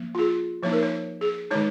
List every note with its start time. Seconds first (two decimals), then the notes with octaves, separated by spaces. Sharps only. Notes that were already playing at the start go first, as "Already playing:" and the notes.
Already playing: F3 A#3
0.15 F4
0.19 G#4
0.63 F3 A#3 D#4 C#5
0.73 A#4
0.83 C#5
1.21 G#4
1.51 D#3 G#3 D#4 C#5